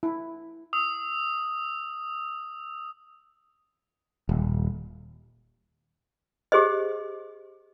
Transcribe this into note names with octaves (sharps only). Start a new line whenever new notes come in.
E4
D#6 E6
D#1
G4 G#4 C5 D#5